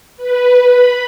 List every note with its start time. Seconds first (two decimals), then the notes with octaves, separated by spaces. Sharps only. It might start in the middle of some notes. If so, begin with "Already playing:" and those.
0.17 B4
0.63 B5